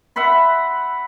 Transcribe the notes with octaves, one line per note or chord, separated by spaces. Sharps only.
E5 F#5 B5 C6